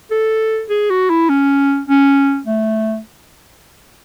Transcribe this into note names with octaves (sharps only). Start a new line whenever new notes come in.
A4
G#4
F#4
E4
C#4
C#4
A3